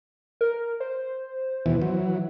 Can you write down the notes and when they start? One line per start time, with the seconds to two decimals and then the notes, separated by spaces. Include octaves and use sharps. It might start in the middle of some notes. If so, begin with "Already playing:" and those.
0.41 A#4
0.80 C5
1.66 E2 B2 E3
1.82 E3 F#3